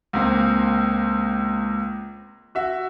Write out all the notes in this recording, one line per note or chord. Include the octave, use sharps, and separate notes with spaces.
C#2 A#3 C4
F#4 E5